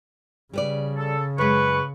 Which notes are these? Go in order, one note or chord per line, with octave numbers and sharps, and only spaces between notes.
C#3 G3 B4 D5
A4
F#2 G#3 B4 C#6